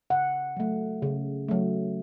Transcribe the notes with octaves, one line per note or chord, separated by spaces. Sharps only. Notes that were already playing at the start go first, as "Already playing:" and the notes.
C#3 F#5
F#3 A3
C#3
F#3 A3